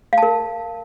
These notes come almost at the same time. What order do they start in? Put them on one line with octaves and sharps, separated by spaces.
F5 A5 A#4